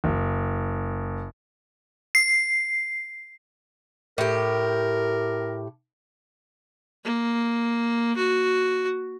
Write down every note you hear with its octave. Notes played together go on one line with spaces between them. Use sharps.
F#1
C7
A2 G4 A#4
A#3
F#4